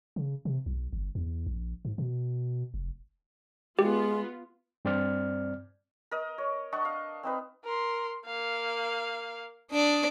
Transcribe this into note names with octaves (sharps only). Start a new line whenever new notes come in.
C#3
C3
B1
G1
E2
A#1
G#2
B2
F1
G#3 B3 F4 G4
G2 C4 D5 F6
A#4 D#5
C#5
D4 D#5 F#5 C#6
F5
C4 D#4 B4
A#4 C6
A#3 F5
D4 D5 D#6